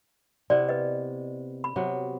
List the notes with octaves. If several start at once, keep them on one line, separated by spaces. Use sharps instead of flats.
C3 B3 E4 D5
B4 D#5
B5
C3 F#3 B3